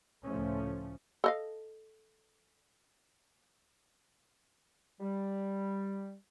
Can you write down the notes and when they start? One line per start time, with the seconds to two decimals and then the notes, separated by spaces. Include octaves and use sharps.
0.23 C#2 A2 F3 A3 C#4
1.24 A4 D#5 F5
5.00 G3